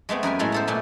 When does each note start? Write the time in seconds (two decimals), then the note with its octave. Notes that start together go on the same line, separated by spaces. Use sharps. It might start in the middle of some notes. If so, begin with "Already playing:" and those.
0.09 G#3 A3 B3 C4
0.23 F#2 A#4 B4 G#5
0.39 A2 G#3 C#4 E4 A4
0.52 B3 A4 C5
0.67 A#2 A3 G#5